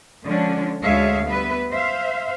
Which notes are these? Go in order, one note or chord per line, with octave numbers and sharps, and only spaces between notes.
D3 F3 G#3 C#4 D4
D2 G#3 G#4 C#5 E5 F5
G3 B3 B4 E5
C5 E5 F5